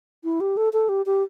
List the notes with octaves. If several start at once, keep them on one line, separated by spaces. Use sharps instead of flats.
E4
G4
A4
A4
G4
G4